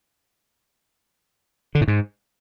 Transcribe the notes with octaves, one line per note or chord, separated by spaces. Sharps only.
D3
A2
G#2